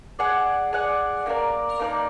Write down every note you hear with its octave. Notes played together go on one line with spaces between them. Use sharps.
G#4 D5 F#5
G#4 D5 F#5
A#3 D#4 A#4 D5
A#3 D#4 A#4 D5